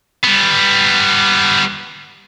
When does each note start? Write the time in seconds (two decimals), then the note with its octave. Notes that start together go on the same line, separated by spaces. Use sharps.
0.24 G3 B3